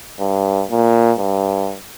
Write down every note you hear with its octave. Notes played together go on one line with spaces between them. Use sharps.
G2
A#2
G2